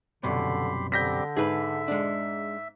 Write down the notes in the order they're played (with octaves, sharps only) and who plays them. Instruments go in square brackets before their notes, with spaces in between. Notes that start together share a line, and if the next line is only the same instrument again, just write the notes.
[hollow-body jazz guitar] C2 F#2 B2 [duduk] D3 [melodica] G4 B5 C6
[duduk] D3 [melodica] G3 C4 G4 [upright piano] G6 A#6 B6
[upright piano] G#2 [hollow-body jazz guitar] G#4 B4 [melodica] E5
[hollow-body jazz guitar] G#3 D4